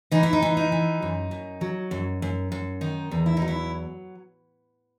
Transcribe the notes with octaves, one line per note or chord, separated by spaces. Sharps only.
E3 D#4
E4
D#4
E3
D#4
E3
F#2
F#2
F#3
F#2
F#2
F#2
D#3 D#4
E2
E4
F#3 D#4
E4